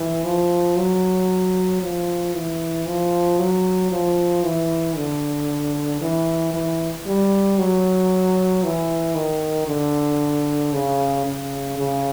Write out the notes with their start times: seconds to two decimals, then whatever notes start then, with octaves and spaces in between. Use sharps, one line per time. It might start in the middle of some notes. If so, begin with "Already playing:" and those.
Already playing: E3
0.25 F3
0.77 F#3
1.82 F3
2.34 E3
2.86 F3
3.39 F#3
3.91 F3
4.43 E3
4.96 D3
6.01 E3
6.54 E3
7.06 G3
7.58 F#3
8.64 E3
9.15 D#3
9.68 D3
10.73 C#3
11.26 C#3
11.78 C#3